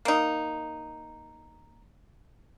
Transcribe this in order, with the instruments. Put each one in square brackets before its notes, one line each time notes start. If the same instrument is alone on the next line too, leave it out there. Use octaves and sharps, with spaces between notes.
[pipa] A#3 D#4